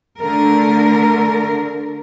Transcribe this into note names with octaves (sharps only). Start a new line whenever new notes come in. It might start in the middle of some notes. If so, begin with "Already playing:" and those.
D3 A3 A#4